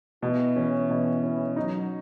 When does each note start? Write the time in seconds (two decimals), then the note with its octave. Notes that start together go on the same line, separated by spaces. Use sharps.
0.22 B2 E3
0.56 E3 C#4
0.90 B2
1.23 C#4
1.56 F#3 D#4